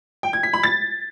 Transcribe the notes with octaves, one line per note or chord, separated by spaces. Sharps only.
G5
G#6
B6
B5
A6